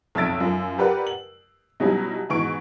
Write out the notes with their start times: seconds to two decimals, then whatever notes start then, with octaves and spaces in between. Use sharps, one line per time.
0.15 B1 F2 E5 E6 A6 D7
0.40 F#2 F4
0.78 G4 A#4 B4 D5 F#5
1.07 F#7
1.80 B2 F#3 G3 C#4 D#4 E4
2.29 G#2 B2 E3 C#6 D7